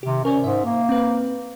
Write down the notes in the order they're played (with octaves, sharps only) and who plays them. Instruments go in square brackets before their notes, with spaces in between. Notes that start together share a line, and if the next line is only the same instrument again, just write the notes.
[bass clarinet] C3 [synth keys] D#3 G4
[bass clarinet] C#4 [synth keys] A#4 C5 D5
[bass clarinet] G#2 [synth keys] E5
[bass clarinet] A#3
[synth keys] C4 B4